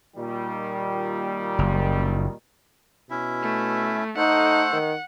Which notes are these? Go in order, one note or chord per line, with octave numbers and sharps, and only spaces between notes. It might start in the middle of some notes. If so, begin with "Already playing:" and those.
A#2 D#3 G3
F#1
B2 C#4 E4 E5
A3
A3 D#4 A4 C5 F#5
D#3